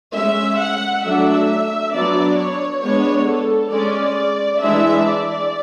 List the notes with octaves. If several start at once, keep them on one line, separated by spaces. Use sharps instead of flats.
G#3 C#4 E5
F#5
F#3 A3 D4 E5
F#3 B3 D4 D5
C#5
G#3 B3 D4 C#5
A4
G#3 C#4 D5
E3 G#3 D4 E5
D5